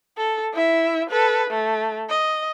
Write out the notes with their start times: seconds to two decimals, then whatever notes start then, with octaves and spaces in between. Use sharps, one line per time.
0.17 A4
0.53 E4 E5
1.10 A4 B4
1.50 A3
2.09 D#5